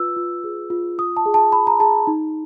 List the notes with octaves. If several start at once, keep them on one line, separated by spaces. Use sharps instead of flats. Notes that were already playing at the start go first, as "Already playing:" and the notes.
Already playing: F4 B4 E6
F4
G#4
F4
F4 D#6
A5
G#4
A5
F4 B5
A#5
G#4 A5
D#4